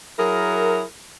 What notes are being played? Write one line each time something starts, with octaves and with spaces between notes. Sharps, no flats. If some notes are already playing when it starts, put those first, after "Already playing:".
F#3 E4 G#4 A#4